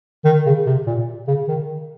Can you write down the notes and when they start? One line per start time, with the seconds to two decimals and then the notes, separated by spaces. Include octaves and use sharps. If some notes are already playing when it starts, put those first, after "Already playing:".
0.25 D#3
0.46 C#3
0.66 C3
0.86 A#2
1.28 C#3
1.48 D#3